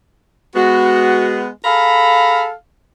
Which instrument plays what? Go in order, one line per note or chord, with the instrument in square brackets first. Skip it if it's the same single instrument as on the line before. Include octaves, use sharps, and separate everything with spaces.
[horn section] G#3 B3 [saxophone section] F#4
[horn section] G#4 A#5 B5 [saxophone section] A4 F5